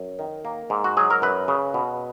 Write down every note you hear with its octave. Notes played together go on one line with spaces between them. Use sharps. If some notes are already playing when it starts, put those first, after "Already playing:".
Already playing: F#2
D#3
A#3
G#2
F#4
F#3 G#4
A#4
F#2 B4
C#3
B2